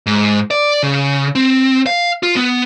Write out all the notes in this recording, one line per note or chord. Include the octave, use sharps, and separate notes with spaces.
G#2
D5
C#3
C4
F5
F4
B3